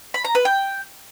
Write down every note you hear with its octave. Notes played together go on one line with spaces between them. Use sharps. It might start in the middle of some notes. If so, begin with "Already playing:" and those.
B5
A#5
B4
G5